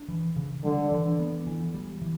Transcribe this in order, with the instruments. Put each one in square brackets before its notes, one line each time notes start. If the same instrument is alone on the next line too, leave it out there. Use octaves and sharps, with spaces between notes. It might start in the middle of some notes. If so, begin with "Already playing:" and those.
Already playing: [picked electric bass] D4
E3
C#3
[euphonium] D3 [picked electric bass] G3
[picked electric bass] E3
B3
E3
G3
E3